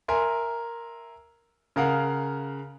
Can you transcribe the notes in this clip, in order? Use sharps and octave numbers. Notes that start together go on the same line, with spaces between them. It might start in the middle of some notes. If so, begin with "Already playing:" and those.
A#4 E5 G#5 C6
C#3 A#4 F5 F#5